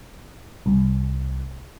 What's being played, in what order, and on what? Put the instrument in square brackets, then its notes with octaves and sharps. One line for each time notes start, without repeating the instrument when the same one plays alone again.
[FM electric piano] C2